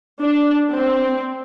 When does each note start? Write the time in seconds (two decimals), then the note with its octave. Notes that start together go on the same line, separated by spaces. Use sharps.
0.21 D4
0.74 C4